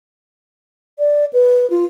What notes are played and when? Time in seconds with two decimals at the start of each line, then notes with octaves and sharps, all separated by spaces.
0.99 D5
1.33 B4
1.70 F4